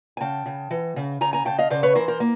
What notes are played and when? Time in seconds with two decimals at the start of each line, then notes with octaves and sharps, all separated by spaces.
0.17 G#5
0.20 C#3 G5 A5
0.46 C#3
0.71 E3
0.96 C#3
1.21 C#3 G#5 A#5
1.33 G#5 A#5
1.45 C#3 G5 A5
1.58 D#5 F5
1.70 C#3 C5 D5
1.83 B4 C#5
1.95 E3 A#4 C5
2.08 A#4 C5
2.20 A#3